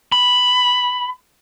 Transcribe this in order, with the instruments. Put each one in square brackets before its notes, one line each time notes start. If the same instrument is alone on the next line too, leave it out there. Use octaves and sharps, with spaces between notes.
[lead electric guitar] B5